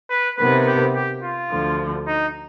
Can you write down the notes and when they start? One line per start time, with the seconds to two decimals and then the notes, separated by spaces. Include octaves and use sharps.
0.09 B4
0.38 C3 D#3 B3 B4
0.66 G4
0.94 G4
1.23 F4
1.51 D2 D3 F3
2.07 D#4